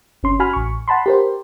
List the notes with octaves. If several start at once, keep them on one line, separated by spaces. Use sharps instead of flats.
G1 C#4 C6
F#4 G#5 B5 F6
A1 C#6
F#5 A5 B5 C6
G4 A#4 C5